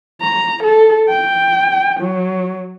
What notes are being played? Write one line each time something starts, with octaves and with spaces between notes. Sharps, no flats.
A#5
A4
G5
F#3